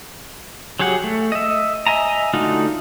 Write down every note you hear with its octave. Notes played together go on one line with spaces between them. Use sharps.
F#3 G4 G#4 F#5
A3
D#5 E5
D#5 E5 G#5 A#5
D3 A3 D#4 F4 F#4